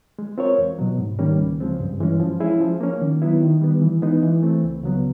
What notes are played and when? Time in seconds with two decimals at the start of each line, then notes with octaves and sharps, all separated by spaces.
0.19 G#3
0.38 C4 F4 A#4 C#5
0.58 E2
0.79 B2 F#3
0.98 G#2
1.19 D#3 G3 A#3 C#4
1.39 C#2
1.60 C#3 F3 G#3 C4
1.80 G2
2.00 E3 G#3 C#4
2.20 F3
2.40 G#3 C#4 E4 G#4
2.60 F3
2.80 A#3 C#4
3.01 D#3
3.22 F#3 B3 E4
3.42 D#3
3.62 G3 B3
3.82 E3
4.02 G#3 B3 D#4
4.23 E3
4.43 A3 C4
4.64 C#2
4.83 C#3 F#3 B3